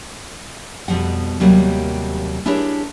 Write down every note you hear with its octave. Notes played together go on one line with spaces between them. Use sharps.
F2 B2 F3 G3 F#5
D#2 C3 F#3 G3 A#3
D4 E4 G4 G#4 A#4 C#5